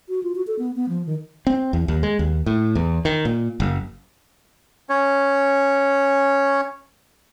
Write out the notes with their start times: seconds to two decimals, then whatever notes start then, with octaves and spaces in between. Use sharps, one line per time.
0.09 F#4
0.23 F4
0.35 F#4
0.47 A4
0.59 B3
0.76 B3
0.89 F3
1.06 D#3
1.47 C4
1.73 E2
1.88 D#2
2.03 G#3
2.19 D#2
2.46 A2
2.75 E2
3.05 D#3
3.25 A#2
3.60 F#1
4.89 C#4 C#5